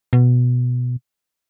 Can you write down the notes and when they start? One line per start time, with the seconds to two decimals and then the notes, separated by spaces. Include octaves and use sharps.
0.13 B2